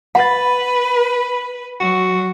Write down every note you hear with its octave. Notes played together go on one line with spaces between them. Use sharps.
B4 F#5 B5 A6
F#3 F#4